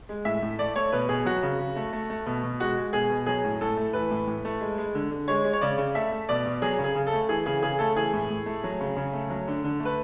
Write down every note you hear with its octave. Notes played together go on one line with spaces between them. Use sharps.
G#3
A2 E5
A2
A3 D5
A3 C#5
B2 B4
B2 G#4
F#3 F#4
C#3
C#3
A3
A3
A3
B2
B2
G#3 F#4
G#3
B2 G#4
B2
F#3 G#4
A2
A2 A4
A3
E3 B4
A2
A2
A3
G#3
G#3
D3
D3
G#3 C#5
G#3
C#5
C#3 D5
C#3
A3 E5
A3
B2 D5
B2
F#3 G#4
C#3
G#4
C#3
A4
A3
E3 G#4
C#3 G#4
C#3 G#4
A3 A4
E3 G#4
A2
A2
A3
F#3
C#3
C#3
A3
F#3
D3
D3
A3
B4